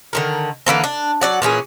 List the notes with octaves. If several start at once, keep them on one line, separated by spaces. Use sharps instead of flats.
D3 D#3 A#4
D3 E3 A#3 C4
D4
F#3 D5 F#5
A#2 E3 C#4 G#4